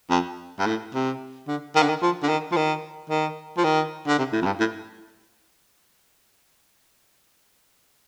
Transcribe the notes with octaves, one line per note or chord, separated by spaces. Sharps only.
F2
G2
A2
C3
D3
D#3
D3
D#3
F3
D3
D#3
F3
D#3
D#3
F3
D#3
D3
C3
A2
F2
G2
A2